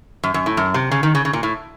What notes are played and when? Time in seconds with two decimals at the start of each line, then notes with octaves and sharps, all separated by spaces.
0.24 F#2
0.34 F#2
0.46 A2
0.57 F#2
0.74 C3
0.91 C#3
1.03 D#3
1.15 C#3
1.25 C#3
1.33 A#2
1.43 A2